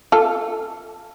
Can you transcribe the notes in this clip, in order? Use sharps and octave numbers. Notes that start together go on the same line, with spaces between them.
F4 A4